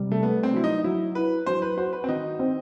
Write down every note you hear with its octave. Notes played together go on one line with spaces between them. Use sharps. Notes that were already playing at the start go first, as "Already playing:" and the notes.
Already playing: C3 G3
A3
A3 B3
C4
F#3 E4
D#4
F#3 E4
E4 B4
F#3 C5
B4
F#4 C5
B4
C4
D#3 D#4
C4